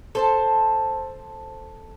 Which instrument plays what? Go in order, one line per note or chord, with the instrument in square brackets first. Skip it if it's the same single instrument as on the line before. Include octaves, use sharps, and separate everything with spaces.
[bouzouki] A4 C5 A5